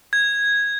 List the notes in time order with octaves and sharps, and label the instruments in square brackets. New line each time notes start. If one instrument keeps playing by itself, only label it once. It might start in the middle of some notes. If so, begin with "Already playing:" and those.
[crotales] G#6